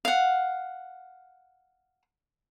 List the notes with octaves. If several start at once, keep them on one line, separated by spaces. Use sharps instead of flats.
F5 F#5